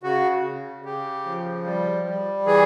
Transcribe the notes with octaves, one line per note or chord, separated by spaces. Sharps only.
C#3 F#4
C#3
C#3 G4
F3
G3
G3
E3 G#4